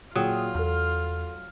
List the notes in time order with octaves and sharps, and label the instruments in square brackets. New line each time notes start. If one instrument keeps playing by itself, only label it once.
[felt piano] A#2 G#4 G5 [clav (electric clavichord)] F#3 [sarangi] F4 [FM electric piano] D#6
[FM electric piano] E2 [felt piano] A4 F6